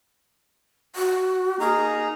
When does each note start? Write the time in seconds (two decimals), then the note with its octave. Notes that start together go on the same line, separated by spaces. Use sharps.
0.95 F#4
1.60 A#3 D#4 G#4 A#5